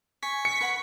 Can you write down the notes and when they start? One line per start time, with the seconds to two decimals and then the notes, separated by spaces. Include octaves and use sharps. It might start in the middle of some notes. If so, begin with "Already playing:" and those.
0.23 G#5 C#6 B6
0.45 C#7
0.61 B4 F#5 B5